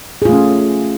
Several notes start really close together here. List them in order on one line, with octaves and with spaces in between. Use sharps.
G#4 F4 A3 C#4